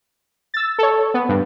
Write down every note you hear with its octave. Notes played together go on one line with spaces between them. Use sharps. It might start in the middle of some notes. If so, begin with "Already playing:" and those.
E6 A6
A4 C#5
B3
G2